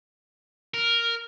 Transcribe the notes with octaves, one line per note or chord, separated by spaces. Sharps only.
A#4